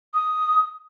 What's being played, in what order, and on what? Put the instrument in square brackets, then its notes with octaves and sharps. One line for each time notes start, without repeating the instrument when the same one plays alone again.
[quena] D#6